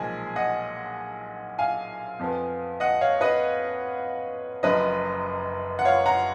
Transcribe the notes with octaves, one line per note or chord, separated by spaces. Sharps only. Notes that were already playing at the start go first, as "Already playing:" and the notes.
Already playing: B1 A#2 F3 G#3 G#4
D#5 F#5
F5 G#5
F2 F3 B3
D#5 F#5
C#5 F5
B4 D#5
F#1 F#2 F3 B4 D#5
F#5
C#5 F5
F#5 A#5